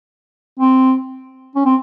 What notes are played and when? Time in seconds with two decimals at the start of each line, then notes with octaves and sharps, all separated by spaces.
0.59 C4
1.56 C#4
1.65 C4